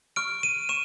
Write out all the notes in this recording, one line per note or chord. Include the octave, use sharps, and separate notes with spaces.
C#6 F6 D7
D#7
C#6 E7